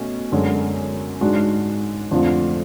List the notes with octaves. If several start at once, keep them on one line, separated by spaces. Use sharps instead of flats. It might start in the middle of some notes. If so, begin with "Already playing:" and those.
Already playing: B2 A3 C#4
F#2 D3 G#3 C#4
G#2 G#3 D4 F#4
F2 D3 F3 A3